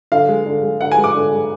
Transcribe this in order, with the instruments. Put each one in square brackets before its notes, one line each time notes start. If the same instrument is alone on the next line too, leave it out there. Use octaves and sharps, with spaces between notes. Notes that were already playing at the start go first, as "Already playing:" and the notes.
[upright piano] D3 F5
G#3
D3
G#3
D3 F#5
G#5
G#3
D6
D3
G#3